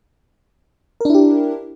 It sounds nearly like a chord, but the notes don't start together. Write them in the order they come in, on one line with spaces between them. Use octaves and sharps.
A#4 D4 E4 G4